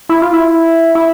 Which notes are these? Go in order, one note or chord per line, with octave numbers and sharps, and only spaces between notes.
E4
F4
E4
E4